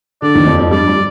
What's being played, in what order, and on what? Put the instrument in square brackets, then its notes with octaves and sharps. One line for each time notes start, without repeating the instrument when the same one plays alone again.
[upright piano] D3 [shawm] D5
[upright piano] D#2 D#3
F2 F3
F2 F3
[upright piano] G2 G3 [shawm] D5
[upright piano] G3